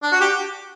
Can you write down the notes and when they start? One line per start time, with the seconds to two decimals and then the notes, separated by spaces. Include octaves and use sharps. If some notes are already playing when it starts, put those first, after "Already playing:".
0.03 D4
0.12 F#4
0.21 G4